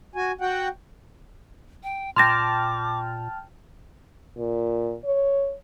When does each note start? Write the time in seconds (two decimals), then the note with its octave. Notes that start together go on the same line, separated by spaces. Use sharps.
0.15 F#4 G#5
0.41 F#4 F#5 G5
1.83 G5
2.16 A#2 G5 A5 C6 D6 F6 A#6
4.37 A#2
5.05 C#5